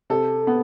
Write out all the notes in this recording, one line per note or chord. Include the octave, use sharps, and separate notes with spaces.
C3 A4
B3